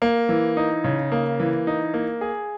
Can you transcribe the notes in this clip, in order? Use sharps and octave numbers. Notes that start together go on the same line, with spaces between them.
A#3
E3
D#4
C#3
A#3
E3
D#4
A#3
G#4